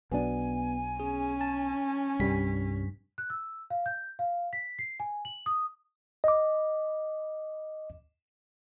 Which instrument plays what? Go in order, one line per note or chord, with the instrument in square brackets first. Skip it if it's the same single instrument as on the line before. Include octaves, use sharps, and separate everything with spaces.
[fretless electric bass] B1 B2 D4 [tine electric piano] B3 [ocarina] G#5
[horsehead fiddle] C#4 [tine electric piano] G#4
[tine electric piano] A5
[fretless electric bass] C2 G3 [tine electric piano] G2 B6
[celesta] F#6
E6
F5
G6
F5
B6
C7
G#5
F#7
D#6
[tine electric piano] D#5 D6